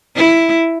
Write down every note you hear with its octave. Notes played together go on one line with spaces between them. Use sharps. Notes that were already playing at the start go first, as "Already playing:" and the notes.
E4